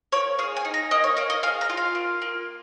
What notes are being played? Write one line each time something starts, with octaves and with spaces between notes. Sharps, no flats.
A#3 C#5
G#4 F5
G#5
D#4
A#5
A#3 D#5
C#5
A#3 F5
D#5
G#4 F5
A#5
F4
F5
A#3
A#3